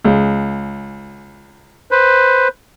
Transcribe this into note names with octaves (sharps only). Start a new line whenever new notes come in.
C#2 G#3
B4 C5